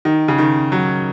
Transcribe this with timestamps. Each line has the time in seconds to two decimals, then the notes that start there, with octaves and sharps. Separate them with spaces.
0.05 D#3
0.28 C#3
0.38 D#3
0.72 F#3